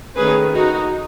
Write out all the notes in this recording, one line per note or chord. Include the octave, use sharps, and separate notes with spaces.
D#3 A3 C#4 G#4 B4
D#4 F#4